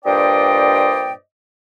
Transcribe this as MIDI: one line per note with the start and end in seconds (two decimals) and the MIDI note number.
0.05 1.13 43
0.05 1.13 46
0.05 1.13 72
0.05 1.13 74
0.05 1.13 75
0.05 1.13 79